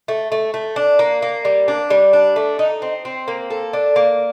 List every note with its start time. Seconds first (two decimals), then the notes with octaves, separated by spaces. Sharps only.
0.08 A3
0.32 A3
0.54 A3
0.76 D4
0.99 A#3
1.22 A#3
1.45 G3
1.68 D4
1.90 G3
2.13 D4
2.36 A3
2.59 D#4
2.82 C4
3.05 C4
3.28 A#3
3.50 A4
3.73 D4
3.96 A#3